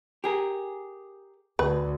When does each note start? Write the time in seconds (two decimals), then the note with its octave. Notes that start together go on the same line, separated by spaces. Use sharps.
0.24 G4 G#4 A#4
1.59 D2 B4